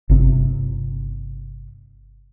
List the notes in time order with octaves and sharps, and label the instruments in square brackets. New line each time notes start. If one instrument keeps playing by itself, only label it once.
[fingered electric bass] G1 C3